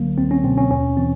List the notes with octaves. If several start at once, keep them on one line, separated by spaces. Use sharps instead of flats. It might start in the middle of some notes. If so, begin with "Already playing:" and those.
Already playing: C#2 D3 F#3 A#3
C#2 C4
C#4
B2 C4
C#4
D#2 C#4
E3 C4